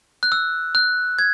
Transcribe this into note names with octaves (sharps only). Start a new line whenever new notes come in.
F#6
E6
F#6
G#6